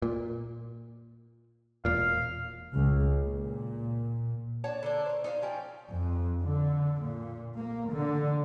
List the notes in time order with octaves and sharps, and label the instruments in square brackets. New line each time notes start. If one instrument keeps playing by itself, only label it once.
[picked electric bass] A#2
[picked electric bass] E1 A#2 [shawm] F5
[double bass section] C#2
A#2
[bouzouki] D4 C#5 F#5 A5
D3 A#3 D4
C5 C#5
D#4 C5 C#5 F5
F3 C#4 G5
[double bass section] F2
D3
A#2
A#3
D3